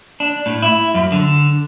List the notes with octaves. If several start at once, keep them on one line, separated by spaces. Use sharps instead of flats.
D4
A2
E4
F#2
D3